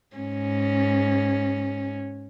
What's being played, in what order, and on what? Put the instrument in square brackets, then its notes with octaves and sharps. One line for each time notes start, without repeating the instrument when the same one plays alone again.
[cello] G#2 C#4